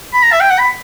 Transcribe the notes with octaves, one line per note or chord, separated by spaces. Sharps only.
B5
A#5
E5
G5
F#5
B5